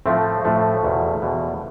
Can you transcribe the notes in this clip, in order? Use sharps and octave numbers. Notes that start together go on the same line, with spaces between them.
A2 F3 A3 C4
A2 F3 A3
E2 B2
E2 B2